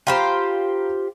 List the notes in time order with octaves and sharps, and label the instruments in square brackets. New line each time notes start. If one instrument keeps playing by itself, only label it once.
[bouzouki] F4 G4 C5 [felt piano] F5 A#5 B5